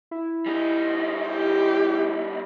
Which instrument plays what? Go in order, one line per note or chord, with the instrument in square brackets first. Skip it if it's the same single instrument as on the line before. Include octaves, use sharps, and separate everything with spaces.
[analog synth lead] E4
[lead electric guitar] G3 D#4
[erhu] G4